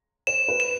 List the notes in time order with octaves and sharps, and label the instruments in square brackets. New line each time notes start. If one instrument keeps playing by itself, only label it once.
[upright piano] C5 [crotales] E7
[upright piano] B4
[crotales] E7